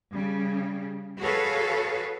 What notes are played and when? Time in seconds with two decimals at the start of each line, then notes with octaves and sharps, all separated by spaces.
0.11 C#3 G3
1.20 F#4 G#4 A4 B4 C#5 F5